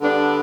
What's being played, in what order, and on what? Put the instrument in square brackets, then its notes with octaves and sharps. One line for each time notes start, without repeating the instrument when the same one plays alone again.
[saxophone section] D3 G3 B3 D4